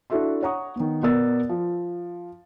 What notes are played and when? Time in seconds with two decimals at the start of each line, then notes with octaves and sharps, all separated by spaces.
0.10 D4 E4 F#4 A4 E5 C6
0.42 C#5 F#5 A#5 C#6 D#6
0.76 D#3 B3
1.02 B2 B3 A#4 D5 E6 A6
1.49 F3